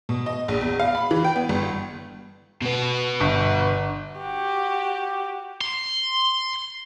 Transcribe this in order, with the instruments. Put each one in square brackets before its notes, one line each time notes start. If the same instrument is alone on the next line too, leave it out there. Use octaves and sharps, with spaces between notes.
[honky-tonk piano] B2
D#5
A#1
E2
F5
B5
E3
G5
B3
G1
[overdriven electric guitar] B2 B3
[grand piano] G1
[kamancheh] F#4 G4
[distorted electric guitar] C6